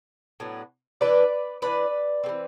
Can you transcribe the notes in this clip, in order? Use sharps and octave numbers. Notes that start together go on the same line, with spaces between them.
A2 F#3 B3 D4
E3 A3 D4 B4 D5
E3 B3 D4 B4 D5
A3 C4
E3